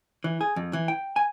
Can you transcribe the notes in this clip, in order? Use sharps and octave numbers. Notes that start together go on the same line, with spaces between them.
E3
G#4
F2
E3
G5
G#5